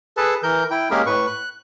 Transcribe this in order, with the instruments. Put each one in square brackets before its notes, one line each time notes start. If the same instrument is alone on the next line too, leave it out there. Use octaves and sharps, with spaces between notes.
[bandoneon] G#4 A4 B4 A5
E3 A#4 G6
E4 G5
G#3 A#3 C#4 G4 G#4 A#4
A2 B4 C#6
F#6